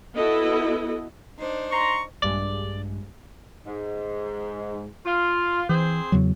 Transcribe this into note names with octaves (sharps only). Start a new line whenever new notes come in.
B3 E4 F#4 A4 D#5
D4 D#4 C5
A#5 C6 C#6
A#1 G2 G#3 D5
G#2
F4
E3 C4 G#4 C5
E2 C#3 F#3